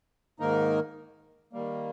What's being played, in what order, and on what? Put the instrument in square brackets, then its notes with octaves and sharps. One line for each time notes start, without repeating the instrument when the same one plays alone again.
[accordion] G#2 D#3 A#3 D#4 A#4
D#3 G3 A#3